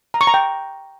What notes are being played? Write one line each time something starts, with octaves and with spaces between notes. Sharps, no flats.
A#5
C#6
A#5
G5